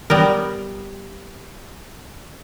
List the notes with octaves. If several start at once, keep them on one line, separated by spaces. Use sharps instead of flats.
G3 B3 A#4